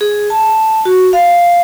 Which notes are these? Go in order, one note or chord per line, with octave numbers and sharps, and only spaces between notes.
G#4
A5
F#4
F5